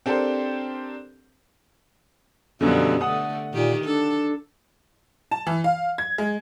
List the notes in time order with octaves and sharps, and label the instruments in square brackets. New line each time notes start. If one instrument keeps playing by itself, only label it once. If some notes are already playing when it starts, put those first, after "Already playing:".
[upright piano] C4 D4 G4 A4 A#4 C5
[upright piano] F#2 B2 D3 [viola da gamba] F3 G3 B3
[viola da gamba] D3 A3 [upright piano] F#5 D#6
[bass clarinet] A#2 [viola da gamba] D#3 G4
[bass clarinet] D4 [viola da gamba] A4
[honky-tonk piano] A5
E3
F5
G#6
G#3